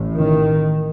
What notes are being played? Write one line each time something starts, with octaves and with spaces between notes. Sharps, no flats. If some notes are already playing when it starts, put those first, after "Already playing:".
Already playing: A1 A2
D#3